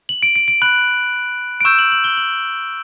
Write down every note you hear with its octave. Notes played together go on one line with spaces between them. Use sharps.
F#7
D7
D7
D7
B5 F#6 F#7
D7
C#6 E6 G6 E7
F#7
F#7
G7
F#7